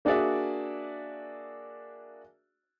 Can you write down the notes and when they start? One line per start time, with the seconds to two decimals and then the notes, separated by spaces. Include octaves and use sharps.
0.05 A#3 D4 F#4 G#4 D5 E5